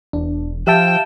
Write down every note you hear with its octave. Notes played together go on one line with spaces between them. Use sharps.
E1 D4
F3 G4 E5 F5 G5 A5 E7